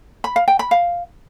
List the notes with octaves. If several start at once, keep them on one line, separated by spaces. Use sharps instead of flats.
B5
F5
G5
B5
F5